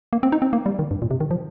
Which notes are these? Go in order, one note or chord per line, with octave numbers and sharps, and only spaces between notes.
A#3
C4
D#4
C4
A#3
G3
D#3
G2
A#2
C3
D#3
F3